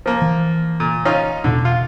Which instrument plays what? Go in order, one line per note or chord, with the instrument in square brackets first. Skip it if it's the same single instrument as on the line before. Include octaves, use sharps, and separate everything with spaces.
[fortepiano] F3 A#3
[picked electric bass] E3
[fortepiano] A#2
C#4 D#4 F4
[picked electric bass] E1 B2 [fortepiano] D3
[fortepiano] F4